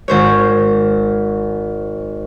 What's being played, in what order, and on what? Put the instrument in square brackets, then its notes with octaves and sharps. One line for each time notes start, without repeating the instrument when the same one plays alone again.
[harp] G#1 C5 C#5